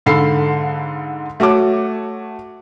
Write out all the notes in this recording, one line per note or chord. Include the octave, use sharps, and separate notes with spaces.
G#2 D3 A4 F5 B5 C7
A3 F#4 C#5 A5 D6